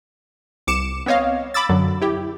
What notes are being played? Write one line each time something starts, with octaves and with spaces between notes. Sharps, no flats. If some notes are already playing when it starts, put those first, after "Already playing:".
C2 D6 C#7 E7
B3 C4 C#5 D#5 F5
B5 D6 E6 A6
F#2 D3 F#3
E4 G4